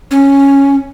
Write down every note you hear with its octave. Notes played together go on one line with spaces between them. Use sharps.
C#4